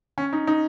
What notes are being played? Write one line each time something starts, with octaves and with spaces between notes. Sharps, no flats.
C#4
D#4
D#4